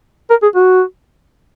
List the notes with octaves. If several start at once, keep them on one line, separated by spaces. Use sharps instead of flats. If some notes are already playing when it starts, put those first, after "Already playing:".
A#4
G#4
F#4